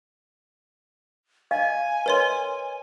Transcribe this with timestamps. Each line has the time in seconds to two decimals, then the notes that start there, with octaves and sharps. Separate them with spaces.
1.51 D#5 F5 G#5
2.06 A#4 B4 C#5 D#5 C6